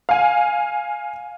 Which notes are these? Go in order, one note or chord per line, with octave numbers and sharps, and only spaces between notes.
F5 G#5